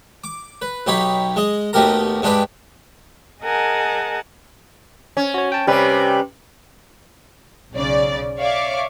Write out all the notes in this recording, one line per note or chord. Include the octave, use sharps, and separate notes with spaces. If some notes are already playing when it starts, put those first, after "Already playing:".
D6
B4
B1 D#4 G4 C#5 B5
G#3 D#5
D#2 B2 A3 G4 A#4 A#5
G2 G#3 D4 G4 B4 D6
G#4 A#4 D#5 F#5 G#5 A5
C#4
F#4 C#5
G5 A5
C3 G3 C#4 G4 B4
B1 C#3 D5
C#5 D5 E5 F5 C#6 D6